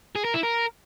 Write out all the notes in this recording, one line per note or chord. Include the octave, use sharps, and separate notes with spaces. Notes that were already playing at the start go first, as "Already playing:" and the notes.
G#4
A#4
E4
A#4